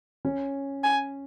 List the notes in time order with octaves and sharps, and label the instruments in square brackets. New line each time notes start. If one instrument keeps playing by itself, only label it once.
[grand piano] C#4
[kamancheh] G#5